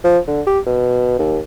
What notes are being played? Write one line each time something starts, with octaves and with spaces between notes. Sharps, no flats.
F3
D3
G4
B2
D#2